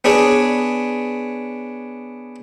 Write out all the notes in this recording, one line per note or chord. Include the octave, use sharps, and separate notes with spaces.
B3 D4 G#4 C#5